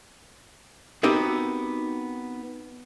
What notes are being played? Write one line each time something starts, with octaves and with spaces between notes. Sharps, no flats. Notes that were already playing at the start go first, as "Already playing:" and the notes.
B3 C4 D#4 F#4 G4 A#4